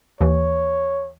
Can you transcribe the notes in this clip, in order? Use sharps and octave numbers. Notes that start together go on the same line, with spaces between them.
D#2 E3 C#5